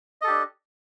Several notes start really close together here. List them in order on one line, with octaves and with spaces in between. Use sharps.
D#5 A4 G4 D4